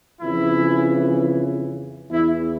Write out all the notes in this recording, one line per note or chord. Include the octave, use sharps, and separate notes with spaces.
F2 C#3 E3 E4
E2 E3 E4